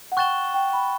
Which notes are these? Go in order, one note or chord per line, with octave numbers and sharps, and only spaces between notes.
F#5
G5 C#6 F#6 A6 E7 G7
G5
B5